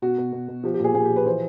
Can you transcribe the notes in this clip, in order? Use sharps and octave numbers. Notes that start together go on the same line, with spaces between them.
B2 F#4
B2
B2
B2
F3 G4
G4
A#2 G#4
A#2 G#4
F3 G4
B4
E3 C5